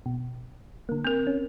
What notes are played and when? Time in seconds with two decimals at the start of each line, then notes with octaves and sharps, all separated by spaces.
0.06 B2
0.89 D3 A#3
1.04 C4 A#4
1.27 C#4